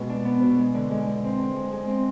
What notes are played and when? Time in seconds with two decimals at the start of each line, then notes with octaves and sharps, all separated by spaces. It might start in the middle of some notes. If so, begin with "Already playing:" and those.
Already playing: B2 G#3 F4
0.09 D4
0.25 B3
0.42 B2
0.58 G#3
0.74 D3
0.91 G#3
1.07 D3
1.24 C4
1.39 D3
1.56 G#3
1.72 G#3
1.88 C4